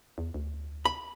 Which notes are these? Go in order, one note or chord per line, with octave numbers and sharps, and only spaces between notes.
E2
D2
B5